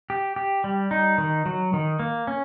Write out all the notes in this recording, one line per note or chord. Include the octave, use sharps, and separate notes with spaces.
G4
G4
G3
D#4
D#3
F#3
D#3
A#3
C#4